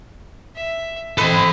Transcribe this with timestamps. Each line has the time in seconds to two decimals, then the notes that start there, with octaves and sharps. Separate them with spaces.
0.55 E5
1.18 C4 A4 D#5 B5 C6